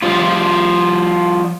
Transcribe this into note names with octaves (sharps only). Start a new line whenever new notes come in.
F3 G3 F4